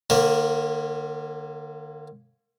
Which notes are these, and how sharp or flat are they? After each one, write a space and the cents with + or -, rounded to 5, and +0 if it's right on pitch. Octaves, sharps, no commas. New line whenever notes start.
D3 +40 A#3 +0 C#5 -35